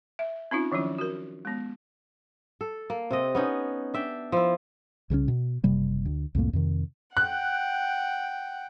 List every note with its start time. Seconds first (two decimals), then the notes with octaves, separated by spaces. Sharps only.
0.19 E5
0.51 C4 C#4 D#4 F4
0.72 D#3 F3 F#3 C#4 E4
0.98 F#4 A#4
1.45 G#3 B3
2.61 A4
2.90 A#3
3.11 C3 C4 A4 D#5
3.35 B3 C#4 D#4
3.94 D4 E5 G5
4.32 F3 E4
5.10 C2 C#3 F3 C#4
5.28 B2
5.64 F#1 C3 G3 A#3
6.05 D2
6.35 C2 F2 A2 A#3
6.53 F2 C3 D#3
7.17 F#5 G5 F#6